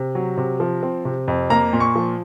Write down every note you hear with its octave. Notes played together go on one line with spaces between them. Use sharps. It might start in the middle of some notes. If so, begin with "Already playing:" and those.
Already playing: C3
F#3
C3
F3
C4
C3
F2
A#3 A#5
A#2
C#6
F3